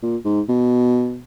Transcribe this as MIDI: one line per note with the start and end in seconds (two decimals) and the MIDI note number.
0.03 0.17 46
0.25 0.41 44
0.48 1.21 47